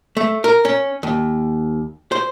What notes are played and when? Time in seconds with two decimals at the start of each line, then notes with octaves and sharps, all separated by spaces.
0.17 A3
0.44 A#4
0.65 C#4
1.03 D#2
2.12 C5